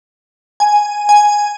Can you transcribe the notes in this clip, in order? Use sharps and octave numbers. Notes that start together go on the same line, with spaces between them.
G#5
G#5